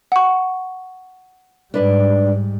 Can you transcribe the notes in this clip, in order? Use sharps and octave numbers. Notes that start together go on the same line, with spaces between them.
F#5 C#6
G#2 G3 D4 B4 D5